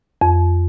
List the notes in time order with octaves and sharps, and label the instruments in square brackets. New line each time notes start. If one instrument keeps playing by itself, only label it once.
[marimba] F2